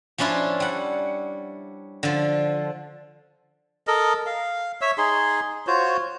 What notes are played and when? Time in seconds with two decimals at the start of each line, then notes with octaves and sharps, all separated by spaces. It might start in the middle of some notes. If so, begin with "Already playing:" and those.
0.18 F3 C#4 D4 E4 F4
0.60 G3 F#5
2.03 D3 F3
3.87 A4 A#4 D#5
4.27 F5
4.81 C#5 E5 E6
4.98 D#4 G#4 C6
5.67 F4 F#4 C5 C#5